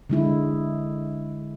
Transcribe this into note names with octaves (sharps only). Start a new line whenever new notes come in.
D3 G#3 E4